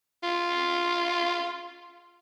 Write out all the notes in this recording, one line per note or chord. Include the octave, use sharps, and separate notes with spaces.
F4